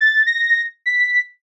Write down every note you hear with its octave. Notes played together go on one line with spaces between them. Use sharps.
A6
A#6
B6